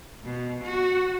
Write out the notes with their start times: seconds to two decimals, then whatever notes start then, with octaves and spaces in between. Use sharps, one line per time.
0.22 B2
0.62 F#4